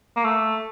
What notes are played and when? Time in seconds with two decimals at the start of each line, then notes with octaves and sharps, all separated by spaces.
0.16 A#3
0.24 A3